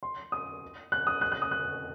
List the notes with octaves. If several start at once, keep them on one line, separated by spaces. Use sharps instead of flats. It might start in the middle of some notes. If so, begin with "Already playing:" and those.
C6
D#6
F#6
D#6
F#6
F#6
D#6
F#6